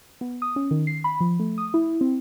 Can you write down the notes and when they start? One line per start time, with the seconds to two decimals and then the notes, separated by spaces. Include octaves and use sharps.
0.21 B3
0.42 D#6
0.56 C#4
0.71 D#3
0.87 C7
1.04 B5
1.20 F3
1.40 A3
1.58 D#6
1.74 E4
2.01 C4